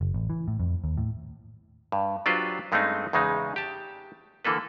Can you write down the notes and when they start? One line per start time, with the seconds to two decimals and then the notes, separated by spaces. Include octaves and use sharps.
0.01 F#1
0.14 A1
0.30 E3
0.48 A2
0.60 F2
0.84 D#2
0.98 A2
1.92 G2
2.26 F#3 D4 F4 G4 B4 C5
2.72 G2 G#3 A3 C4 C#4 D#4
3.13 E2 C#3 G#3 D#4
3.56 G4 A5
4.45 D3 E3 A#3 A4 B4